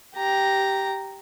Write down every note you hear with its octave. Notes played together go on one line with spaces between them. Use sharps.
G4 A#5